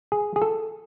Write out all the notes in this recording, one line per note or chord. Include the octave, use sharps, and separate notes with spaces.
G#4
G#4
A4